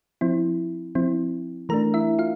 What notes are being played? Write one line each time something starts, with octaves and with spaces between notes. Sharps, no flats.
F3 C4 E4
F3 C4 E4
E3 A3 D4 A#4 A#5
E4 E5
F4 F5